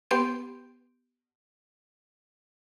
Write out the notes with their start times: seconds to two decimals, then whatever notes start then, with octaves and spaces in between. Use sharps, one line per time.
0.11 B3 G4 C6 G6 D7